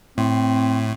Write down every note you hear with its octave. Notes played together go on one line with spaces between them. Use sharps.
A2 C4